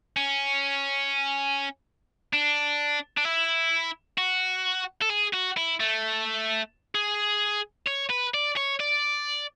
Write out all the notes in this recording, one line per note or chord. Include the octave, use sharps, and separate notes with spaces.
C#4
D4
D4
E4
F#4
A4
G#4
F#4
E4
A3
G#4
C#5
B4
D5
C#5
D5